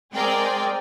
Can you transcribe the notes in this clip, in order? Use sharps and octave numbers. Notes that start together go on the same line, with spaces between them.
G#3 C4 G#4 A#4 D5 G5